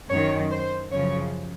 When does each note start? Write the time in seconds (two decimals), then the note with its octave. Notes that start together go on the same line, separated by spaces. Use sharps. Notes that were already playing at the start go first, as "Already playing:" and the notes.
0.10 F#2 D#3 C#5
0.51 C5
0.92 F#2 C#3 F3 C#5